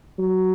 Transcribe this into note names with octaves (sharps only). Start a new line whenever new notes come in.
F#3